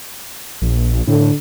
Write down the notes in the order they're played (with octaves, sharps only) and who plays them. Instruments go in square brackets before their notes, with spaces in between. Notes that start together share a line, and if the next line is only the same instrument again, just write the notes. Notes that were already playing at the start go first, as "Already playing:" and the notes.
[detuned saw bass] A#1
[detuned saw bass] A2 [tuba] D3